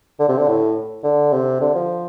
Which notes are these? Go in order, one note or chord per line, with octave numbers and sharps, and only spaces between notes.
D3
C3
D3
A2
D3
C3
D3
F3